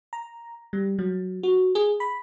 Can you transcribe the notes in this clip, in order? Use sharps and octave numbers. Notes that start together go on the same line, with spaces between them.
A#5
G3
F#3
F#4
G#4
B5